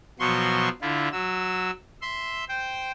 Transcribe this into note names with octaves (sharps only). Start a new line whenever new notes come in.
B2 F3 F#3 C6 C#6
D3 E4 F4
F#3 E6
E5 C6
C5 G5